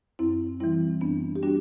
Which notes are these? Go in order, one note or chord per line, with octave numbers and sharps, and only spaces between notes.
F#2 C4 E4
E3 G3 C4 E4
F#2 B3 D4
G4
G3 D4 F#4